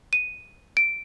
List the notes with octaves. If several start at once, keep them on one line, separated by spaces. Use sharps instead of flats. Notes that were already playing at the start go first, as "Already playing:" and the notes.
D#7
D7